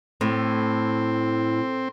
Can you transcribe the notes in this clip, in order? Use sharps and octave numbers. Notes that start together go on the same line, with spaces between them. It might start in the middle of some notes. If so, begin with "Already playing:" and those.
A2 C4